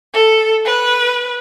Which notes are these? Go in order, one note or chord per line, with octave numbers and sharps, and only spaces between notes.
A4
B4